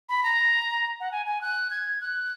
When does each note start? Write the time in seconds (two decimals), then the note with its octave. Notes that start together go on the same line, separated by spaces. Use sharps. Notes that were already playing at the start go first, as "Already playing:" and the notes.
0.09 B5
0.23 A#5
1.00 F#5
1.12 G#5
1.26 G#5
1.41 F#6
1.70 G#6
2.01 F#6